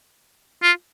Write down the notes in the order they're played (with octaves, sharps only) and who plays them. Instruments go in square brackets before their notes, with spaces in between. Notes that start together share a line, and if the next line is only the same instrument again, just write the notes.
[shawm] F4